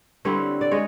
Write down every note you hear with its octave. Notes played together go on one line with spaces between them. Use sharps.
D3 G3 C4 E4 B4 C#5
D5
G#3 C#5 D#5